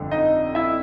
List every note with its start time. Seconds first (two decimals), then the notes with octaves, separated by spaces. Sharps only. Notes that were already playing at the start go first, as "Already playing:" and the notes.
Already playing: G1 F2 D3 A3
0.11 D#4 D#5
0.55 E4 E5